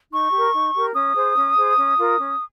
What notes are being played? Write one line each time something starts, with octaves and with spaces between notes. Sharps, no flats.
D#4 C#6
G4
A#4
D#4
G4 A#4
C#4 D#6
G#4 C5
C#4
G#4 C5
C#4
F4 A#4
C#4